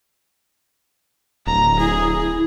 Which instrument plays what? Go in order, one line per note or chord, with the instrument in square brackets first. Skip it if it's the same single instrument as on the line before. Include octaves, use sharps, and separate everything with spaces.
[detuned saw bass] D1 [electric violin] A#5
[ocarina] E4 [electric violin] G#4